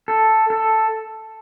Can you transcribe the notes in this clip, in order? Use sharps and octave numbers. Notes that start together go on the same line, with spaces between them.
A4
A4